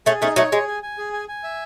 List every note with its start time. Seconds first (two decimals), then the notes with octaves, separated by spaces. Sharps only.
0.06 A3 C#4 G#4
0.22 A3 C#4 D#4
0.36 F#3 A3 C#5
0.52 G#3 G#4
0.67 G#5
0.83 G#5
0.98 G#4
1.13 G#5
1.28 G#5
1.44 E5